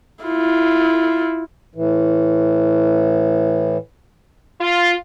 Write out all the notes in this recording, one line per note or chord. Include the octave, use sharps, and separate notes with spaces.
E4 F4
A2 E3
F4